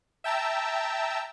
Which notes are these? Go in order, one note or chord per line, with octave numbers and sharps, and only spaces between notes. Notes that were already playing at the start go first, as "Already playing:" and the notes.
E5 G5 A5 A#5 E6